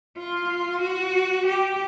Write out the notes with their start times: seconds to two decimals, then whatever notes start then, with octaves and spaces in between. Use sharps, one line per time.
0.18 F4
0.81 F#4
1.46 G4